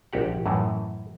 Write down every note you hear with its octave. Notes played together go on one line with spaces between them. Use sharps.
A#1 F#4 G4 F#5
F#2 A2 E3